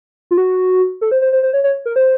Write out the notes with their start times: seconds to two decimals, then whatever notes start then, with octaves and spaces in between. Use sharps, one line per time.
0.31 F4
0.38 F#4
1.01 A4
1.11 C5
1.22 C5
1.33 C5
1.43 C5
1.53 C#5
1.64 C#5
1.86 A#4
1.96 C5